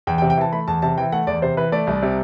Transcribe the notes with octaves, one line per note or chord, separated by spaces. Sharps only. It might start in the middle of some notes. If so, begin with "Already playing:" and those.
E2 G5
G5
C3
G5
E3 A5
A3 B5
E2 A5
C3 A5
E3 G5
A3 F#5
E2 D5
C3 C5
E3 B4
A3 D5
C2
C3